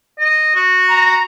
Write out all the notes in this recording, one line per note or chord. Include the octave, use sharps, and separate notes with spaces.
D#5
F#4
A#5